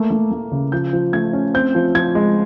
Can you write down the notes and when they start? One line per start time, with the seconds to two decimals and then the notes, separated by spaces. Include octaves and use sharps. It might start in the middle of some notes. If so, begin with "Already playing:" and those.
Already playing: A3 A#3
0.11 A3
0.31 A3
0.52 C#3
0.72 F3 G6
0.93 F3
1.13 A3 G#6
1.33 C#4
1.54 C4 G6
1.75 F3
1.95 F3 G#6
2.15 G#3